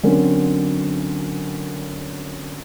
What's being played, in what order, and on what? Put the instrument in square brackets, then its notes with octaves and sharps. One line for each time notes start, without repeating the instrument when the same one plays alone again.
[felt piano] D3 F#3 C4 C#4 A#4